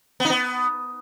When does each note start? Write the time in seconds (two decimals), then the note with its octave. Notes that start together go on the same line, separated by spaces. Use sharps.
0.20 B3
0.25 D#4
0.30 B3